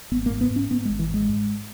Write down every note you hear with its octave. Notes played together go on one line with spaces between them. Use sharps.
G#1 B3
A#3
G#2
B3
G#2
C#4
G#2 B3
G#3
G#1
E3
G#2 G#3
G#2